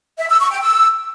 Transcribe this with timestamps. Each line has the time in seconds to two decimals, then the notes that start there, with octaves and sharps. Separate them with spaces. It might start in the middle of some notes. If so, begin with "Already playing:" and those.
0.18 E5
0.29 E6
0.40 C#6
0.51 G5
0.62 E6